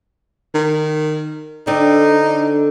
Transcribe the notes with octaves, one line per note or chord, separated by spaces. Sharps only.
D#3
D3 C4 D4 D#4